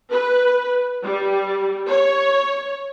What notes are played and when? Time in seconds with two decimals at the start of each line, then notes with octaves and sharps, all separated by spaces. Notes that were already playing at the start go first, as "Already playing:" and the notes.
0.11 B4
1.03 G3
1.89 C#5